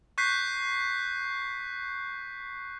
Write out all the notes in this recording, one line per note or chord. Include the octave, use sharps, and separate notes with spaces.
C#6 F#6 G6 B6 C7